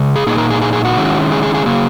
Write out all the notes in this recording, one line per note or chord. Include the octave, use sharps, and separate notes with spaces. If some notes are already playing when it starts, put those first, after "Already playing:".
Already playing: C#3 G#3
G#4
A#2 A#3 D#4 G#4
A#4
G#4
G#4
G#4
F#4
D#3 G#3 C#4 E4
G#4
G#4
G#4
C#3 F#3 A#3 G#4